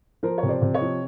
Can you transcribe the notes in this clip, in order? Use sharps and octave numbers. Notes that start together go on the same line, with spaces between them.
F3 A#4 C5
C#5
C3
C5 D5
C3
C#5 D#5
F3